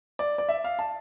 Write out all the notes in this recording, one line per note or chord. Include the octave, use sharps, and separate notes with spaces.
D5
D5
E5
F5
A5